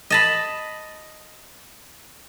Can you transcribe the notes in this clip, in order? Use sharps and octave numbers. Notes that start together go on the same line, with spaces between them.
D#5 A5 B5